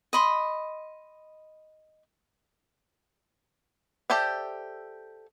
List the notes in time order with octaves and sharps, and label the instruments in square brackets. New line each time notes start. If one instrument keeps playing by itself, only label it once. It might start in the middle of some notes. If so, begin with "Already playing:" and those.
[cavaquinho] D#5 B5 C6
[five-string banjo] G4 A4 C5 D5 E5